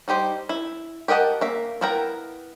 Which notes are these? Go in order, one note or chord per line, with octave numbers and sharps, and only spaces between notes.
G3 D#4 G4 C5
E4
G4 A#4 D#5 F#5 A5
A#3 E5
B3 E4 A#4 G5 A#5